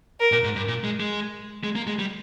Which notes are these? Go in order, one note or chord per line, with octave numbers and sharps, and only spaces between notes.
A#4
A#2
G#2
G2
A#2
G#3
G#3
G#3
A#3
G#3
G3